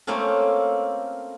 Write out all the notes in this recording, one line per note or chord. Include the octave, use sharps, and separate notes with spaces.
A3 A#3 C4 C#4 F4 A4